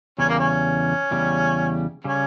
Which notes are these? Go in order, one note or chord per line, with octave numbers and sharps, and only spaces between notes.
E2 C#3 G3 C#4
A#3
C#4
E2 C#3 G3
C#3 G3 C#4